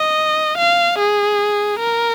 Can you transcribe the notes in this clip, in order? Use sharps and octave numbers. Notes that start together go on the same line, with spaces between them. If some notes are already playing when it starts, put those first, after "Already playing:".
Already playing: D#5
F5
G#4
A#4